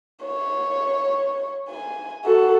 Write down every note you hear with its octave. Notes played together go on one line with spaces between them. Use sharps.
C#5
G#5
F#4 A4